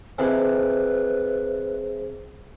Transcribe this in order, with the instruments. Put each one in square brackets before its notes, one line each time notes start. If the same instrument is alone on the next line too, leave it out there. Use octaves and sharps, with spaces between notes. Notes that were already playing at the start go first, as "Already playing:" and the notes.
[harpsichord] F2 C3 E3 [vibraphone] G#4 C5 [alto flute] B4